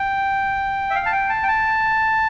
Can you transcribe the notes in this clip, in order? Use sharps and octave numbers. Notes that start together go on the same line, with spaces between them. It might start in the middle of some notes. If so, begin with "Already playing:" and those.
Already playing: G5
E5
F5
A5
G5
A5
G5
A5